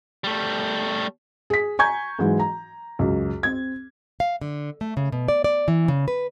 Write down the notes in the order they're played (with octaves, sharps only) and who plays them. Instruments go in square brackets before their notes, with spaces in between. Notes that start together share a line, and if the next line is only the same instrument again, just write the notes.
[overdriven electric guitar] G3 A3
[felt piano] G#4 B6
G#5 A#5 C#6 G6 G#6
G#2 E3 F#3 G#3
A#5
C#2 F#2
C4 G#6
[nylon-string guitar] F5
D3
A3
C#3
B2
D5
D5
E3
C#3
B4